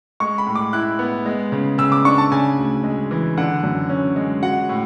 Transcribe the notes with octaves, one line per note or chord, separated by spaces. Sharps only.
G#3 C#6
B5
A2
D6
E4 F#6
B3
G#3
C#3
C#3 E6
D6
D4 C#6
A5
C#3 G#5
D2
G#3
E3
D3 F#5
F#2
C#4
G#3
F#3 F#5
A2